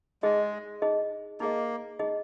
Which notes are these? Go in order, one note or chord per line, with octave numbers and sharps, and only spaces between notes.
G#3 D#4 G#4 D#5
D#4 G#4 D#5
A#3 D#4 G#4 D#5
D#4 G#4 D#5